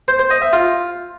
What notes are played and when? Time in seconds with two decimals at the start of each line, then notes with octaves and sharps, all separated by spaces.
0.08 C5
0.19 C5
0.31 D#5
0.42 E5
0.53 F4